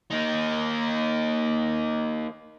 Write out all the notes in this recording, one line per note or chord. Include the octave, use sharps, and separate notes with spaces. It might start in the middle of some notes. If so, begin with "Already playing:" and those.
A#3 D#4